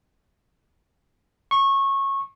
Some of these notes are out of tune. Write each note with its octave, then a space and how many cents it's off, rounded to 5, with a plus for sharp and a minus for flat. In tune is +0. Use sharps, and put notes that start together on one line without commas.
C#6 -20